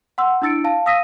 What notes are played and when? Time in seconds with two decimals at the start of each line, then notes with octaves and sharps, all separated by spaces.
0.18 F#5 C6 E6
0.42 D4 E4 E6 A6 C#7 D7
0.64 F5 A5
0.86 F5 D#6 E6 A#6 B6 D#7